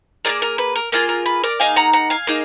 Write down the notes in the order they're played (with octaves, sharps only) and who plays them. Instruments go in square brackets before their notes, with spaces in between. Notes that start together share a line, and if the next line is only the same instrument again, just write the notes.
[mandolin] A#3 F4 G#4 A#4 D5
A#4
B4
A#4
A#3 F4 G#4 A#4
A#4
B4
A#4 D5
A#3 D#4 G#4 F5 G#5
F#5 A#5
F#5 A#5
F5 G#5
A#3 D#4 G#4